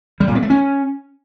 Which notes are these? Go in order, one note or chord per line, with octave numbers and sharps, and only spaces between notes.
G3
A#2
B3
A3
C#4